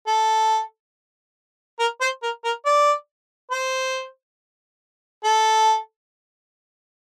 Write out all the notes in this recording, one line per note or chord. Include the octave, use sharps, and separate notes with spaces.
A4
A#4
C5
A#4
A#4
D5
C5
A4